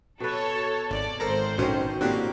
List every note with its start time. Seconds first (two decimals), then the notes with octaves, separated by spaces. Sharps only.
0.20 B2 A4 B4 C#5
0.90 G#1 D5
1.20 G#1 A4 A#4 C5 A#5
1.58 A#1 B2 D#3 C#4 C#5
2.01 A2 A#3 C4 D4 F#4 G4